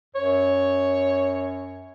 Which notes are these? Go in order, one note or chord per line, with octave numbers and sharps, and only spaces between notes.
F#2 C#5